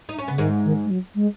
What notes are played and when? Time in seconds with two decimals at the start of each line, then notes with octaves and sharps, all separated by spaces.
0.09 D#4
0.19 C#4
0.28 C#3 B3
0.38 G#2 D#3 G#3
0.64 D#3
0.85 G#3
0.90 F#3
1.15 G#3